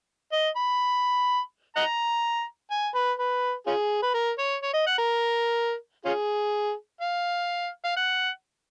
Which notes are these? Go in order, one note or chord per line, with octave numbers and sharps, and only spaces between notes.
D#5
B5
D#5 F#5 A#5
G#5
B4
B4
C#4 F4 G#4
B4
A#4
C#5
C#5
D#5
F#5
A#4
C#4 F4 G#4
F5
F5
F#5